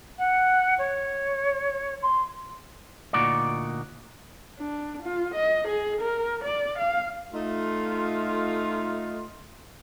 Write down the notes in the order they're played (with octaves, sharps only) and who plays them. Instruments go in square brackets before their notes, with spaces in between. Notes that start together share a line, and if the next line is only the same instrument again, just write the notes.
[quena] F#5
C#5
C6
[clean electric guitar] D2 A#2 D#4 F#4 D5
[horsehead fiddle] D4
F4
D#5
G#4
A#4
D5
F5
[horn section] A3 D#4 F4